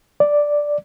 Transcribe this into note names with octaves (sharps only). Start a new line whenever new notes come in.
D5